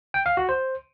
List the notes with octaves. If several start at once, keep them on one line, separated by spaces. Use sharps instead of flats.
G5
F5
F#4
C5